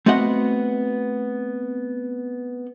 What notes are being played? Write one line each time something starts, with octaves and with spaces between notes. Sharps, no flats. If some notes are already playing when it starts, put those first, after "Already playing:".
A3 B3 C4 F#4 D#5 F#5